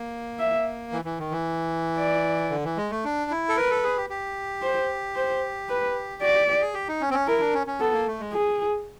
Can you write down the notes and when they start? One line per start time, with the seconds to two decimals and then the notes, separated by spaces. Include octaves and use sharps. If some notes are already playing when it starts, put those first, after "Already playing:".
Already playing: A#3
0.39 E5
0.92 E3
1.05 E3
1.19 D#3
1.31 E3
1.98 D5
2.51 D3
2.64 E3
2.77 G#3
2.91 A3
3.05 D4
3.31 E4
3.49 A4
3.56 A#4 B4
3.71 A4
3.84 G#4
3.97 G4
4.10 G4
4.62 C5
5.16 C5
5.69 B4
6.21 F#4 D5
6.34 G4
6.48 G4
6.61 G#4
6.74 G4
6.88 D#4
7.01 C#4
7.10 C4
7.14 C#4
7.27 E4 A#4
7.40 D4
7.54 C#4
7.67 C#4
7.80 B3 A4
7.93 A#3
8.07 A3
8.20 G#3
8.33 G#4